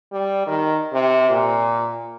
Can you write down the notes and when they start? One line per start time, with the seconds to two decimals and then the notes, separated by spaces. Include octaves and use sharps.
0.12 G3
0.47 D#3
0.93 C3
1.30 A#2